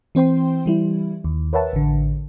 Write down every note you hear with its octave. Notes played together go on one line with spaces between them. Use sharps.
E3 C4 C5 G5 C6
E3 G3 E4
D#2
A#4 B4 C#5 E5 F#5 A5
A1 D3